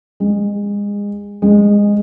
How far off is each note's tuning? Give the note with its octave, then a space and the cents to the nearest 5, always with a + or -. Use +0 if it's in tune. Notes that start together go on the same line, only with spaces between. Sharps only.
G#3 -30
G#3 -20